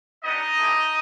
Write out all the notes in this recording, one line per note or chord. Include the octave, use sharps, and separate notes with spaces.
B3 D4 D#4 G4 D#5
A3 C4 E4 G4